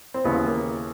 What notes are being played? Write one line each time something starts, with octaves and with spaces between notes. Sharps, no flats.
C4
D#2 C#3 E3 B3
A#3